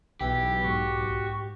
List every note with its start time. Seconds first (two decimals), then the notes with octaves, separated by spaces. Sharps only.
0.21 B1 E3 E4 G4
0.64 G#2 F#4 C#6